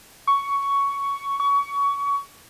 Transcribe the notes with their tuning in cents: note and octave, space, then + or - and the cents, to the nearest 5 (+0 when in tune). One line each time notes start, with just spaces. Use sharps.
C#6 +10
C#6 +25